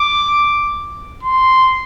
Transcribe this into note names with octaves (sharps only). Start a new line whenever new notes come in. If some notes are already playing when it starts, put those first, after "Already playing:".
Already playing: D6
C6